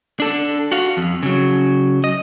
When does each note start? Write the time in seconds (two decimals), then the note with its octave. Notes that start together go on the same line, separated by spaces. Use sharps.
0.20 D4 A4
0.72 F#4 F5
0.97 F2
1.23 C#3 F#3
2.04 D#5